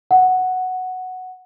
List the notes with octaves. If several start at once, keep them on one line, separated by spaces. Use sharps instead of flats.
F#5